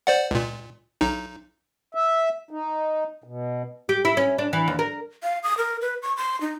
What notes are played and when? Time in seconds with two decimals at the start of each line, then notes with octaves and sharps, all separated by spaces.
0.07 C5 D5 F#5
0.31 C#2 A#2
1.01 B1 D#4
1.95 E5
2.51 D#4
3.24 B2
3.89 G4
4.05 E4
4.17 C#4
4.38 D4
4.53 E3
4.68 D#2
4.79 A#4
5.23 F5
5.43 D#6
5.58 A#4
5.81 B4
6.02 C#6
6.17 C6
6.41 D#4